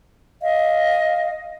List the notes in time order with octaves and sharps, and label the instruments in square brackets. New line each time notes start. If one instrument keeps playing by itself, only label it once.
[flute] D#5 [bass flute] F5